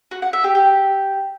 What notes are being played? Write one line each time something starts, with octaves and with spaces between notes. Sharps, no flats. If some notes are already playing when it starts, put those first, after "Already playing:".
F#4
F#5
E5
G4
G4